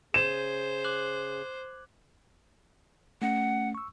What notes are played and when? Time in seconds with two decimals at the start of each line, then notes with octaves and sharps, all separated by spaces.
0.14 C#3 G#4 C5 G6 G#6 D#7 E7
0.84 D6 F#6 F#7
3.22 A3 C#4 F#5
3.75 C#6 E6